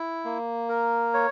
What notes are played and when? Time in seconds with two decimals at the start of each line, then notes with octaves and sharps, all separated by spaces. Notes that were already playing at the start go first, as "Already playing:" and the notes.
Already playing: E4
0.25 A#3
0.69 A#4
1.14 C#5